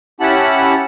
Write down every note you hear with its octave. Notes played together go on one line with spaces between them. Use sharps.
C#4 E4 G4 F#5 A5 B5